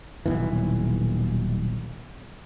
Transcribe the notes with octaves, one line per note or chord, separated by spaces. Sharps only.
D#1 B1 E3